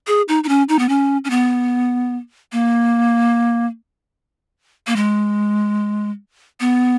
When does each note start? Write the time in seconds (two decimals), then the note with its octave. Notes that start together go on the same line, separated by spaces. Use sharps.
0.07 G#4
0.28 D#4
0.44 D#4
0.49 C#4
0.69 D#4
0.79 B3
0.89 C#4
1.25 C#4
1.30 B3
2.52 A#3
4.87 A#3
4.96 G#3
6.60 B3